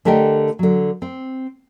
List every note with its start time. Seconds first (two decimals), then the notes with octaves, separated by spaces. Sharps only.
0.05 D3 A3 G4 A#4 D#5 G5
0.59 D3 F#3
1.02 C4